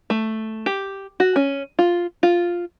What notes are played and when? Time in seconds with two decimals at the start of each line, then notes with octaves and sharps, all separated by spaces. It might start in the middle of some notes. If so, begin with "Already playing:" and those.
0.10 A3
0.66 G4
1.20 F#4
1.36 C#4
1.79 F4
2.23 F4